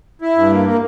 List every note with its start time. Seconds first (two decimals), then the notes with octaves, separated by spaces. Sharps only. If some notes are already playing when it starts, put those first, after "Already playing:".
0.22 E4
0.36 G2
0.51 A#3
0.66 A#3